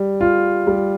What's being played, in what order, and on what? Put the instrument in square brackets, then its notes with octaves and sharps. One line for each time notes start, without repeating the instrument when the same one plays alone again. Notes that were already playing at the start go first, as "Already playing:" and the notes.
Already playing: [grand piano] G3
F4
G3